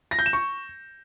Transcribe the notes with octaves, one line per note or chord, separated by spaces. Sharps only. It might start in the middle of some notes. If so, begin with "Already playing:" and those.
A#6
G6
E7
C#6